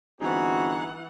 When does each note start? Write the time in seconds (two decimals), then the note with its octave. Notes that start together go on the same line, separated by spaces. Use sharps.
0.20 G1 E3 C4 D#4 F#4 G#4 F#5